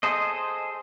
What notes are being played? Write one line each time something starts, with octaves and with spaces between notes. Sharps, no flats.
G#4 A4 C5 D#5